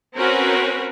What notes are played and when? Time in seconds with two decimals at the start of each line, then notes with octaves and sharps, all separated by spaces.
0.15 C4 C#4 F#4 A#4 B4